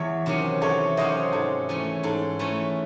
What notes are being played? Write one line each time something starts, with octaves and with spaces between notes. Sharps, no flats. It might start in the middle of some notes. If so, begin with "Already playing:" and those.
Already playing: E2 C#5 E5
C3 D#3 F#3 C#4
E2 A4 C#5
C3 D#3 F#3 C#4 C5 D#5
G#2 A4 C#5
E3 A3 C#4
G#2 A4
E3 A3 C#4